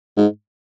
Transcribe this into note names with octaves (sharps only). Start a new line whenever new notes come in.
G#2